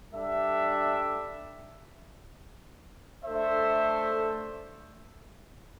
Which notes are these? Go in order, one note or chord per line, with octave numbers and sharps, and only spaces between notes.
G3 D4 A4 E5
A3 D4 A4 C5 E5